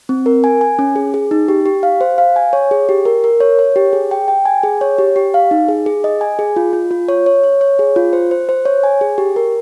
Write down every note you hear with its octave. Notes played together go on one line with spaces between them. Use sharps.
C4
A#4
G#5
G#5
C#4
G#4
G#4
D#4
G4
G4
F5
C5
F5
G#5
C#5
G#4
G4
A#4
A#4
C#5
C#5
G4
G#4
G5
G5
G#5
G#4
C#5
G4
G4
F5
D#4
G#4
G#4
D#5
G#5
G#4
F4
F4
F4
C#5
C#5
C#5
C#5
G#4
F4
C5
C5
C5
C#5
G#5
G#4
G4
A#4